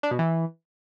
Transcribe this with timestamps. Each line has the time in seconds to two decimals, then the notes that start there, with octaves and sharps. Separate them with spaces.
0.03 D4
0.11 B2
0.19 E3